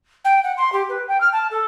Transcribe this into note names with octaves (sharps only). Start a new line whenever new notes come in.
G5
F#5
C6
G4
B4
G5
F6
A5
A4